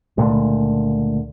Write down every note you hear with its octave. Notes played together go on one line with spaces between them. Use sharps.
C#2 A#2 D3 A3